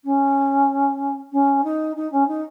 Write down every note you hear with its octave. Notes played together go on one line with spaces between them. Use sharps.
C#4
C#4
D#4
D#4
C#4
D#4